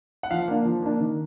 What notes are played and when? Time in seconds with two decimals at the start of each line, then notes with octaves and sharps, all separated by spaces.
0.23 F#5
0.31 F3 F5
0.48 A#3 D4
0.65 F3
0.82 A#3 D4
1.01 D#3